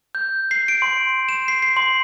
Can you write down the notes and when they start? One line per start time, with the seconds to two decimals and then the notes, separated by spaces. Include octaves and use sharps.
0.15 G6
0.51 C7
0.68 D7
0.82 C6
1.29 E7
1.48 C7
1.62 C7
1.77 C6